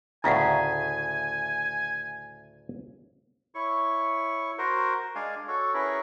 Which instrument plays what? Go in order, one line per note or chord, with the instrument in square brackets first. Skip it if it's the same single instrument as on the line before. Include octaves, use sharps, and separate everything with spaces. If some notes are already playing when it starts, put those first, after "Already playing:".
[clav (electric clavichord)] D2 A2 C#3 [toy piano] E4 F5 F#5 [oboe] G#5
[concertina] E4 C#5 C#6
F#4 A#4 C5
G#3 D4 D5 F5 G#5
F#4 A4 C#5
C#4 E4 G#4 A#4 B4 C#5